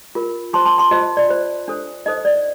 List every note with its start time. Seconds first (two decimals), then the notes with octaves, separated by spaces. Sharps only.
0.15 F4 A#4
0.53 F4 C5 A5 C6
0.66 A5 C6
0.78 A5 C6
0.91 F4 C5 D#5
1.17 D5
1.29 F4 C5
1.68 D4 A4 C5
2.06 D#4 A4 C5 D#5
2.25 D5